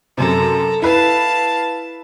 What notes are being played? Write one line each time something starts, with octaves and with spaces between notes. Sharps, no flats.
F#2 C3 A4 A#5
E4 B4 F5 A5